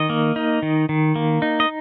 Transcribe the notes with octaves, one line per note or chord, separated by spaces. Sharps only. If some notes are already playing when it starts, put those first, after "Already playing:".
Already playing: D#3 D#5
A#3
D#4
D#3
D#3
A#3
D#4
D#5